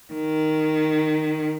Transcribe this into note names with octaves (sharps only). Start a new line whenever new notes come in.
D#3